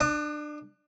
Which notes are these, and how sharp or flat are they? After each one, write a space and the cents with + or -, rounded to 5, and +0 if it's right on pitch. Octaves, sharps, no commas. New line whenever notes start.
D4 +25 D#6 -40